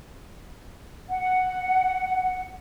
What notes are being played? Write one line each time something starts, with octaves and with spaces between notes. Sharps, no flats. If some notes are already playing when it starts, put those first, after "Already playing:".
F#5